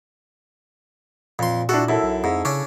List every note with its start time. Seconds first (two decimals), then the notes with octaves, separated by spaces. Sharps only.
1.39 F2 A#2 C6
1.69 D4 E4 F#4 A4
1.89 F#2 E4 A4
2.03 B1
2.24 F2 G#2
2.45 C#3 C#4 D4